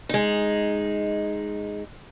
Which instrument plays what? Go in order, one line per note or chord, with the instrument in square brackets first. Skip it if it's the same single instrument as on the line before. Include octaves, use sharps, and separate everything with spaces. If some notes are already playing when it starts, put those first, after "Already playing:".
[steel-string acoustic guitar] G#3 D#4